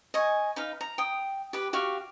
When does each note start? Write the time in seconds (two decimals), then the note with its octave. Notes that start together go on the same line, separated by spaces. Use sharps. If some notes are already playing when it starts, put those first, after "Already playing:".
0.14 D#5 G#5 C#6
0.56 D#4 B4 F5
0.81 A#5
0.98 G5 D#6
1.53 G4 B4
1.73 F#4 G4 F5 C#6